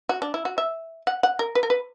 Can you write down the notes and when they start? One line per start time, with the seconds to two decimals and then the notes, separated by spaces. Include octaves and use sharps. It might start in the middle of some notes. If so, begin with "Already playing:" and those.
0.09 F#4
0.22 D4
0.34 E4
0.45 F#4
0.58 E5
1.07 F#5
1.23 F#5
1.39 A#4
1.55 B4
1.63 A#4
1.70 B4